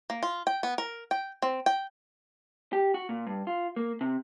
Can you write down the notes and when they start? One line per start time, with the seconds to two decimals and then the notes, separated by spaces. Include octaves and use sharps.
0.10 A#3
0.23 F4
0.47 G5
0.63 B3
0.78 A#4
1.11 G5
1.42 C4
1.66 G5
2.73 G4
2.94 F#4
3.09 A#2
3.27 G2
3.47 F4
3.76 A#3
4.01 C3